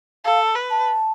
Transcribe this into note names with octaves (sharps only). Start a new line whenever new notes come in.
A4 F5
B4
A5